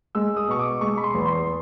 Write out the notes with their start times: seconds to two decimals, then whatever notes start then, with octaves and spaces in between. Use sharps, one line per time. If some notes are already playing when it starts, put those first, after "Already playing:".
0.15 G#3 E6
0.37 D#6
0.48 B2 C#6
0.59 D6
0.81 G#3 C#6
0.97 B5
1.04 C6
1.15 E2
1.25 C6